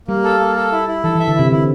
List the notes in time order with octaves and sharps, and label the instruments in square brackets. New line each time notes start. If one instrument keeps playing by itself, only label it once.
[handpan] G3 [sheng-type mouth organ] A#3
[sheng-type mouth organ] A4
A#3
A4
E4
E4
[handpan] E3 [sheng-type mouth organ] A4
[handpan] E3
[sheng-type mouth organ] E5
[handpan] D3
[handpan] C3 [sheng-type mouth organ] E4
[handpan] D3 [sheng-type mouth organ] E4